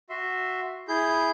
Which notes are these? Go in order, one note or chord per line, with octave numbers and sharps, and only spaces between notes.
F#4 E5 C6
E4 G#4 G6